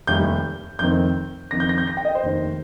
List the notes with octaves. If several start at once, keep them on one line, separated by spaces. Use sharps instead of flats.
F1 D#2 D#3 G3 G6
F1 F2 D#3 C4 G6
F2 D#3 C4 A#6
G6
A#6
G6
A#6
G5
D#5
C5
F1 D#2 D#3